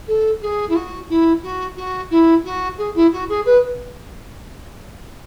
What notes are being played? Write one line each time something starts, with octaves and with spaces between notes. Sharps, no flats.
A4
G#4
E4
F#4
E4
F#4
F#4
E4
F#4
G#4
E4
F#4
G#4
B4